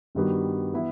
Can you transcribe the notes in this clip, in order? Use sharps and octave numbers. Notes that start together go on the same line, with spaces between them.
G2 D#3 G3 B3 F#4
E3 B3 E4